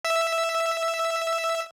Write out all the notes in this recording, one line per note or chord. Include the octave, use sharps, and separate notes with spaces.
E5 E6